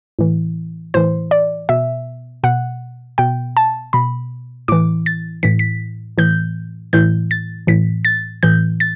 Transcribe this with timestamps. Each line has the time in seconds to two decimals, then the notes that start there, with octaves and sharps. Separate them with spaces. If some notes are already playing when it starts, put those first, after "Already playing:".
0.19 A2 E3
0.94 A2 E3 C5
1.31 D5
1.69 B2 E5
2.43 B2 F#5
3.18 B2 G5
3.57 A5
3.93 B2 B5
4.68 A2 E3 D6
5.06 A6
5.43 A2 E3 B6
5.59 B6
6.18 A2 E3 G6
6.93 A2 E3 G6
7.31 A6
7.67 A2 E3 B6
8.05 A6
8.43 A2 E3 G6
8.80 A6